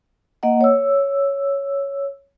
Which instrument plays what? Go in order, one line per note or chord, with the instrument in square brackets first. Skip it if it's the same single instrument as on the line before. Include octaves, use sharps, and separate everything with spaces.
[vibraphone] A#3 D#5 F#5
C#5 E6